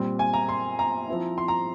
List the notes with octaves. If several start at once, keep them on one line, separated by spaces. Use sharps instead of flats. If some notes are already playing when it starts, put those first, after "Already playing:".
Already playing: A#2 G3 C4
G#5
A#5
C6
A#5
F3 C4 E4
C6
A#5